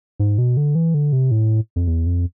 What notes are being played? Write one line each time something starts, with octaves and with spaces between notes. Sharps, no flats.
G#2
B2
D3
E3
D3
C3
A2
F2
E2
F2